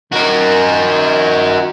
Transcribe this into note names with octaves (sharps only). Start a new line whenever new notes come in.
D#3 F#4 A#4